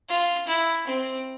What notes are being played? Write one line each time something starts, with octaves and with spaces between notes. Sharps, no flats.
F4
E4
C4